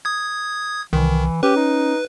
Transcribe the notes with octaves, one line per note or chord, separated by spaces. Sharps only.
D#6 G#6
C2 D#3 E3
C#4 G4 B4
D#4